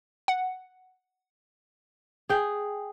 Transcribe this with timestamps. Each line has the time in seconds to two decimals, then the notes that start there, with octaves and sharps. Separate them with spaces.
0.28 F#5
2.29 G#4 G5